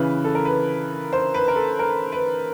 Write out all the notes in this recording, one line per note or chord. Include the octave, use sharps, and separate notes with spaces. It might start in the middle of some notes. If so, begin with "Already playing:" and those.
Already playing: C#3 E3 B4
A4
A#4
B4
C5
B4
A#4
A4
A#4
B4